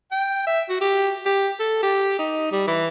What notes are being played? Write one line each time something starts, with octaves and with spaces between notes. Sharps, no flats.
G5
E5
F#4
G4
G4
A4
G4
D#4
G3
E3